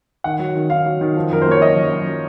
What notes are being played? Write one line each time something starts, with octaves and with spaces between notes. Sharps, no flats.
D#3 F#5
F#3
D#3
D#3 F5
F#3
D#3
F3
F#2 A#4
C5
A#3 C#5
F#2 D#5
F#2
F#2